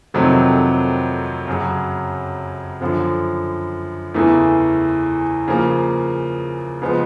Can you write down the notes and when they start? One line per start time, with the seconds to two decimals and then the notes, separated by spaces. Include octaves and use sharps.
0.14 F2 C3 D#3 F#3 A3
1.47 F#2 C#3 F#3
2.81 F#2 D3 F3
4.14 E2 C#3 E3 A3
5.48 C#3 F3 A#3
6.82 C#3 F3 G#3 B3